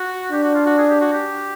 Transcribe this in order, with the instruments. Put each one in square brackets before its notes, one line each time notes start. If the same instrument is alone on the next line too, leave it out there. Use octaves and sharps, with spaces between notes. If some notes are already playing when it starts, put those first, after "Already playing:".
Already playing: [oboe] F#4
[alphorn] D4 [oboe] G4
[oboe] F#4
F4
F#4
G#4
G4
F#4
G4